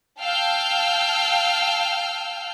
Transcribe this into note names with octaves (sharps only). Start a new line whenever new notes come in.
F5 G5 A5 E6 F6 G6